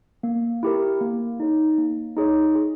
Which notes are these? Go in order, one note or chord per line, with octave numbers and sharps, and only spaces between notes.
A#3
E4 G4 A#4
A#3
D#4 G#4 C#5
A#3
D#4 G#4 C#5
G#4